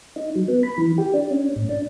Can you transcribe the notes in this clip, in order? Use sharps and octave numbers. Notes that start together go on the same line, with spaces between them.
D#4
F#3
B3
B5
E3
G4
D4
C#4
A2
D4